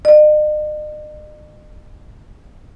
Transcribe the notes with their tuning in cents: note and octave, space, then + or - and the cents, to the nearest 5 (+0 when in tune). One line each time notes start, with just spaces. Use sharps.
D#5 -45